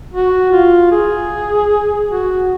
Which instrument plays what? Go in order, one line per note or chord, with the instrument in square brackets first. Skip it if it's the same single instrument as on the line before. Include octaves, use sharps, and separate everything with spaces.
[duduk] F#4
F4
G#4
F#4